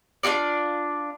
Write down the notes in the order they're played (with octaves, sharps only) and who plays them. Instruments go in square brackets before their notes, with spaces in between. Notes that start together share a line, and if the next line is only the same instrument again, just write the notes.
[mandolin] D4 F4 F#4 D5